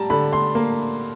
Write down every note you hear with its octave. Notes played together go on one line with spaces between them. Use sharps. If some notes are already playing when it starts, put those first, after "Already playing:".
Already playing: G3 A5 A#5
D3 B5
C6
A#3